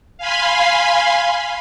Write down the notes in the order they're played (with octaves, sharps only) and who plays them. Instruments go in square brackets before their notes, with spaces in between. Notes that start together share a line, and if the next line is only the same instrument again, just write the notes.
[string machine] F5 G#5 B5 C6